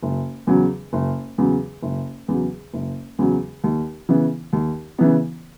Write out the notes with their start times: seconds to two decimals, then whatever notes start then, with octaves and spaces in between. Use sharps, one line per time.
0.03 F#1
0.47 E2 C#3 F#3
0.93 F#1
1.38 E2 C#3 F#3
1.82 F#1
2.28 E2 C#3 F#3
2.74 F#1
3.19 E2 C#3 F#3
3.64 D#2
4.09 C#3 E3 B3
4.53 D#2
4.98 C#3 E3 B3